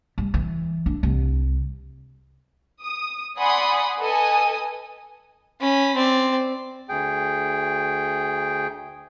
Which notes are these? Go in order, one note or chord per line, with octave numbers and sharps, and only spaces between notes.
G3
E3
D4
C2
D#6
D5 F#5 G#5 B5 C6 D#6
A4 B4 D#5 G#5 D#6
C#4 B5
C4 D5
D2 G#4 G5